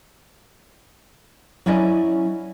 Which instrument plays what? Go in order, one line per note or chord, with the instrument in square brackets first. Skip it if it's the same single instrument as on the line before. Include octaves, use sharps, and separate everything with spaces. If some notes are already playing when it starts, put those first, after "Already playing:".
[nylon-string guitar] F#3 C#4 E4 D5 D#5